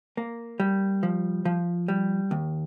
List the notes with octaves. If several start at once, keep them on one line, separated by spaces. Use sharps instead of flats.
A#3
G3
F3
F3
G3
D#2